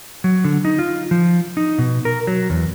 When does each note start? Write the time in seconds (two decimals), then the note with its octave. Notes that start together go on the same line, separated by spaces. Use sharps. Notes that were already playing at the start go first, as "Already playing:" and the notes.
0.24 F#3
0.45 D3
0.65 D#4
0.79 F4
1.11 F3
1.57 D#4
1.79 B2
2.05 A#4
2.27 F#3
2.50 E2